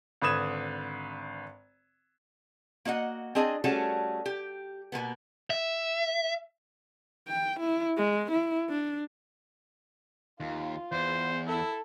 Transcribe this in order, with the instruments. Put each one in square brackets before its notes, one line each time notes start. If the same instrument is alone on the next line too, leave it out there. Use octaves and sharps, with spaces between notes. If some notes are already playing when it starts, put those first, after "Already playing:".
[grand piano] G#1 D3 B4 D#6 G#6 E7
[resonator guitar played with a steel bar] A#3 F#4 D#5 F#5
C4 D4 G#4 D#5 G#5
G3 A3 C#4 F#4 G#4 A5
G4
B2 G#3 A#3 B3
[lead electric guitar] E5
[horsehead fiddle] G5
E4
G#3
E4
D4
[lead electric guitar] D#2 [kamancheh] F4
[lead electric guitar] E2 [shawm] C5
[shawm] E4 [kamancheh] A4